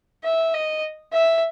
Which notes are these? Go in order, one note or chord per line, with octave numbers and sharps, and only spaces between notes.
E5
D#5
E5